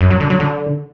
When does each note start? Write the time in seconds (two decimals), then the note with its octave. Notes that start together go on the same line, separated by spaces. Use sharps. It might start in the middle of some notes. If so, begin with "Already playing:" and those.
0.01 F#2
0.10 F#3
0.20 D3
0.30 F#3
0.40 D3